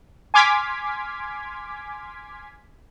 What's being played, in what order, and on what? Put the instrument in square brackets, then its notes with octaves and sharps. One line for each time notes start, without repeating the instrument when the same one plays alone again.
[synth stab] G#5 C6 D6 F6 G#6 B6